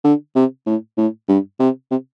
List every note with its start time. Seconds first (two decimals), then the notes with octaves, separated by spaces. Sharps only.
0.04 D3
0.35 C3
0.66 A2
0.97 A2
1.29 G2
1.60 C3
1.91 C3